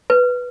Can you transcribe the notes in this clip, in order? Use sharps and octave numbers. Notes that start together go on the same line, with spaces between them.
B4